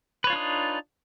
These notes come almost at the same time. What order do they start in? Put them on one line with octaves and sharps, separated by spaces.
B4 C#5 F4 D4 D#4